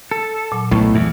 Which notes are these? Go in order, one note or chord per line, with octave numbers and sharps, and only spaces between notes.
A4
A#2 F#3
B1 A2 C#6
E2 E3